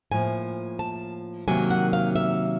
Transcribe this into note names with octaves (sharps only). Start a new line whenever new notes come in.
A2 F3 A#3 G#5
A5
C3 D#3 F#3 A#3 G#5
F#5
F5
E5